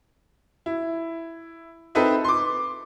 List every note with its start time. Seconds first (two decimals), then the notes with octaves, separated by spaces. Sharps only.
0.66 E4
1.95 C4 D#4 A4 B4 D#5 E5
2.25 C6 D6